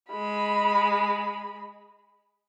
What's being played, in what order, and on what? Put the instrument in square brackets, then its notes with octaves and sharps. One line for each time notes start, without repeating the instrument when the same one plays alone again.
[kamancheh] G#3 B5